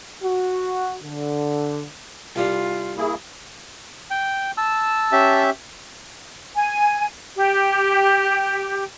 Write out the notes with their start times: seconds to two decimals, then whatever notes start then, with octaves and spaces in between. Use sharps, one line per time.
0.24 F#4
1.04 D3
2.36 C2 G3 F4
2.97 A#3 E4 G#4
4.11 G5
4.57 A5 E6
5.12 C#4 G4 E5
6.56 G#5
7.36 G4